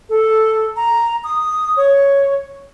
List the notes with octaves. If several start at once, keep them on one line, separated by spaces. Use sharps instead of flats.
A4
A#5
D#6
C#5